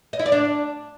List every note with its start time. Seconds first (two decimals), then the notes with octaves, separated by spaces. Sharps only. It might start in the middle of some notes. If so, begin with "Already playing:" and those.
0.13 D#5
0.19 E4
0.26 D5
0.32 D4